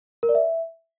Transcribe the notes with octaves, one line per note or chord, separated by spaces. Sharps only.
A#4
D5
E5